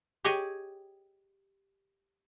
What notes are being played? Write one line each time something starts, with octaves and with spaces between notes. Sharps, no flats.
G4 G#4 C#5 D#5 G5 G#5